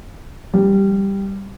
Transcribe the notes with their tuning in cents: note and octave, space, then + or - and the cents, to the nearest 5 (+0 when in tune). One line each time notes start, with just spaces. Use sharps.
G3 +5